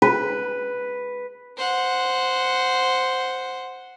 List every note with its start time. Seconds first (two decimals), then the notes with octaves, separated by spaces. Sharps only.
0.02 B4
1.57 C5 F#5